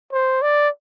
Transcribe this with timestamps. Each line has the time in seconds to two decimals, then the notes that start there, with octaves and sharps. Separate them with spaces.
0.12 C5
0.42 D5